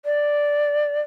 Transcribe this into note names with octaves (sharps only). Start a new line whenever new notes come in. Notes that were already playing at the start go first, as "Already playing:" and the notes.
D5